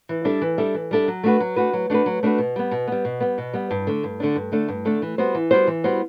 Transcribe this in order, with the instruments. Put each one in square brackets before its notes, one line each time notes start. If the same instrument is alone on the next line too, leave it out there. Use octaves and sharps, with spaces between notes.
[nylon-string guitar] E3
G3 D4 A4 E5
E3
G3 D4 A4 E5
E3
G3 D4 A4 E5
F#3
A3 D4 F#4 B4
F#3
A3 D4 F#4 B4
F#3
A3 D4 F#4 B4
F#3
A3 D4 F#4 B4
B2
G3 B3
B2
G3 B3
B2
G3 B3
B2
G3 B3
G2
D3 A3 D4
G2
D3 A3 D4
G2
D3 A3 D4
G2
D3 A3 D4
E3
G3 B3 F#4 C5
E3
G3 B3 F#4 C5
E3
G3 B3 F#4 C5